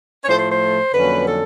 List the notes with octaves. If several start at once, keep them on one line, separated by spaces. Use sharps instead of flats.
C#5
A2 F3 A3 C5
C5
C5
F2 D3 F#3 A#3 C#4 B4
A4